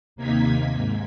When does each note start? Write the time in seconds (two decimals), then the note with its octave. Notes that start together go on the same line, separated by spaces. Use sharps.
0.16 D#2 C3 A#3 D#4 G#6 B6
0.73 G#2